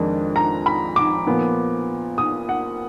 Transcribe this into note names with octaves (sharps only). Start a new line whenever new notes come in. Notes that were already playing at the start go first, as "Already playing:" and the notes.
Already playing: F2 D#3 G#3 D4
A#5
B5
D6
A#2 F3 B3
D#6
F#5